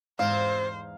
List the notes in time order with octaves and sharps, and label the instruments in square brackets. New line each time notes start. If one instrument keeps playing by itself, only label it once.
[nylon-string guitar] E2 G#2 [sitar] C3 C4 [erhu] C5 [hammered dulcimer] F5